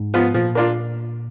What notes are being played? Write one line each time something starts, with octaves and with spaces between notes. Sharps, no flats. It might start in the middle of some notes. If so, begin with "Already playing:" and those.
Already playing: G#2
F3 B3 F4
A#2 F3
A#3 D4 F4